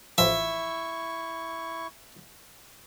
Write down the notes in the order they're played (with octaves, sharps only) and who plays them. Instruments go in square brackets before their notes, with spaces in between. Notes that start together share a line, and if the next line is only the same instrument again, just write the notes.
[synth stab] A1 F3 [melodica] E4 C#6 [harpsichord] E5